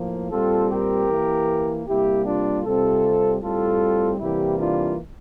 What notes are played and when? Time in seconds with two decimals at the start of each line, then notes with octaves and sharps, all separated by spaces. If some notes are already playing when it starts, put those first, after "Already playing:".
Already playing: A2 F3 A#3
0.31 A#2 G3 C4 F4 A4
0.70 G4 A#4
1.08 E3 A#3
1.87 C3 G3 A#3 E4 G4
2.26 D4 F4
2.65 C3 G3 C4 F4 A4
3.42 A2 G3 C4 F4 A4
4.19 C3 E3 G3 A#3 E4 G4
4.58 D4 F4